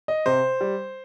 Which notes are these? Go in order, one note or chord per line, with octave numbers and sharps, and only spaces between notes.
D#5
C3 C5
G3